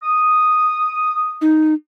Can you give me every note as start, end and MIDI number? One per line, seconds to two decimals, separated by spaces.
0.02 1.47 87
1.41 1.74 63